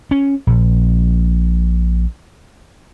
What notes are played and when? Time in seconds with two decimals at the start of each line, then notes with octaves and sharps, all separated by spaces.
0.11 C#4
0.47 A#1